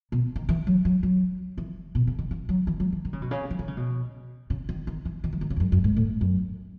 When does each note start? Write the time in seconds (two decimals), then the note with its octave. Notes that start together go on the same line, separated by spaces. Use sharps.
0.12 B2
0.36 D#3
0.49 E3
0.67 F#3
0.85 F#3
1.03 F#3
1.58 E3
1.95 B2
2.07 C#3
2.19 D#3
2.31 E3
2.49 F#3
2.67 E3
2.80 F#3
2.92 E3
3.05 D#3
3.13 C#3
3.22 B2
3.31 C#3
3.51 E3
3.59 D#3
3.68 C#3
3.77 B2
4.50 C#3
4.69 D#3
4.87 D#3
5.05 E3
5.24 D#3
5.33 E3
5.41 D#3
5.50 C#3
5.56 E2
5.60 F#2
5.72 F#2
5.84 G#2
5.97 A2
6.21 F#2